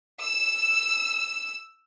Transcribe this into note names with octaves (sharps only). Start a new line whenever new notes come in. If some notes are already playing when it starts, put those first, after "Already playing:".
E6 E7